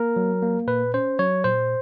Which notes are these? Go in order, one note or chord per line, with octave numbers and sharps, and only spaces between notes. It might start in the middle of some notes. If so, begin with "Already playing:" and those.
Already playing: A#3 A#4
F#3
A#3
A#2 B4
C#4 C5
F#3 C#5
A#2 C5